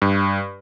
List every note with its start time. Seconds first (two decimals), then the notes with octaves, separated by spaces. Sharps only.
0.02 G2